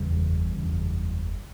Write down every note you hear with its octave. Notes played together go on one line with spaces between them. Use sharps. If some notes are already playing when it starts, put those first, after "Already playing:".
Already playing: F#1 E2 C#3 E3 G3
F#1 E2 C#3